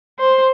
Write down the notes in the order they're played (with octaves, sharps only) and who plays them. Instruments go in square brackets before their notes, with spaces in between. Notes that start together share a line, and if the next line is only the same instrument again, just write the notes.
[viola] C5